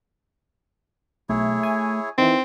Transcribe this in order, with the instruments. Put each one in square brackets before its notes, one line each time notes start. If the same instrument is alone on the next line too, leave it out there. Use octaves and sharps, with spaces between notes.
[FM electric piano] B1 [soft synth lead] A3 [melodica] E4 G#4 C#5
[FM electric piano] G#5
[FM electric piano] D#3 E3 [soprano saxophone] C4